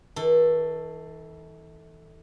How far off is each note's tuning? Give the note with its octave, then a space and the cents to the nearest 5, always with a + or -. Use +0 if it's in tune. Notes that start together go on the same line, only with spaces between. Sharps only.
E3 -45 A4 +10